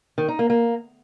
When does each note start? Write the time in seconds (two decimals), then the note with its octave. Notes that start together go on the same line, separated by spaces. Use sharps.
0.18 D#3
0.28 D#4
0.39 A#3
0.50 A#3